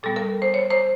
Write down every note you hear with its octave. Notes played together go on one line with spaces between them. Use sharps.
A#2 G3 B3 A4
A#4
C5
C#5
C5